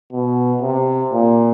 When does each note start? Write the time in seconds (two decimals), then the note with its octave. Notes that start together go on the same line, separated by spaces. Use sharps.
0.13 B2
0.61 C3
1.12 A#2